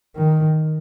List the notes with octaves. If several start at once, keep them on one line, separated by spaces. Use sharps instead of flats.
D#3